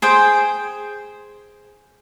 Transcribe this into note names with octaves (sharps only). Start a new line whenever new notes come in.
G#4 C5 G5